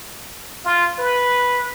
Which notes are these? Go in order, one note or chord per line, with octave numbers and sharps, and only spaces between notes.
F4
B4